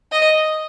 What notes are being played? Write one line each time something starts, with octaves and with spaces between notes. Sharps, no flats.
D#5